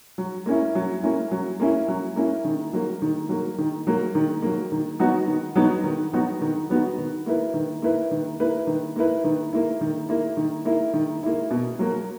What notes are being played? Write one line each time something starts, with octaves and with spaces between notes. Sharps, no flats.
F#3
A#3 C#4 E4
F#3
A#3 C#4 E4
F#3
A#3 C#4 E4
F#3
A#3 C#4 E4
D#3
F#3 A#3
D#3
F#3 A#3
D#3
F#3 A#3
D#3
F#3 A#3
D#3
F#3 B3 D#4 F#4
D#3
F#3 B3 D#4 F#4
D#3
F#3 B3 D#4 F#4
D#3
F#3 B3 D#4 F#4
D#3
A#3 E4 B4
D#3
A#3 E4 B4
D#3
A#3 E4 B4
D#3
A#3 E4 B4
D#3
A#3 E4
D#3
A#3 E4
D#3
A#3 E4
D#3
A#3 E4
B2
F#3 A#3